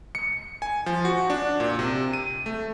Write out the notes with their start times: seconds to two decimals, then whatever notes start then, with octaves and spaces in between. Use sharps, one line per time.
0.15 C#7
0.62 G#5
0.86 F3
1.05 F#4
1.30 D4
1.60 A#2
1.79 C3
2.13 D#7
2.46 A3